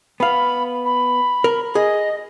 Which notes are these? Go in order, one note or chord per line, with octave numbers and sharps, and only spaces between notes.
B3 F5 B5
B5
A#4
G#4 D#5